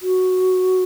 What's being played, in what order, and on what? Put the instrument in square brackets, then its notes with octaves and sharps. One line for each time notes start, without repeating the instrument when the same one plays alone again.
[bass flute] F#4